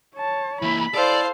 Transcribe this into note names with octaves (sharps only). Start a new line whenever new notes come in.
C#5 A5
E3 A#3 E4 B5
E4 A4 C5 D5 F5